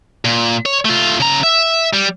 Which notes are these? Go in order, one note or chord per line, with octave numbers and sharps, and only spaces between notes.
A#2
C#5
A3 F4
C#3 A#5
E5
G3